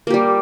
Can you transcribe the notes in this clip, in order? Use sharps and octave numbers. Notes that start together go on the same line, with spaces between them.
G3 A#3 G4